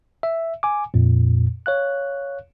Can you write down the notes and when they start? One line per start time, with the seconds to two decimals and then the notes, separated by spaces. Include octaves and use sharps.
0.23 E5
0.63 G#5 D6
0.94 F2 A#2
1.66 C#5 F5 F#6